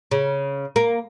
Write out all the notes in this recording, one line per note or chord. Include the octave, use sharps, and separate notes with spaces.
C#3
A#3